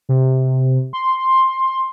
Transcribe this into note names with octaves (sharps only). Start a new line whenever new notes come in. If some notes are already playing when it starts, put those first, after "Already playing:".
C3
C6